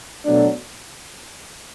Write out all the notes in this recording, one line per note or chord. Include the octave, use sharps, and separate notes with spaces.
B2 F#3 A3 D4